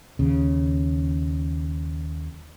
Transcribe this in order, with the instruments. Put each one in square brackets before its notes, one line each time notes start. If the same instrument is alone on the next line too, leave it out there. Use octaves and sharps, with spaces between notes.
[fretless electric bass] D#2 C#3